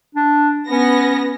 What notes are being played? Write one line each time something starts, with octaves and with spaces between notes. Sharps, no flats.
D4
B3 C#4 A#6